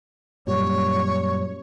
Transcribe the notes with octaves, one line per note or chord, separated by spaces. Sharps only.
F#2 A#2 G3 C#5